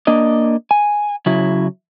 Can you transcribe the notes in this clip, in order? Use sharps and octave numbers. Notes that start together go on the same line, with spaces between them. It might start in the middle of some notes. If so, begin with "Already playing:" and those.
A#3 D4 D#5
G#5
C#3 F#3 E4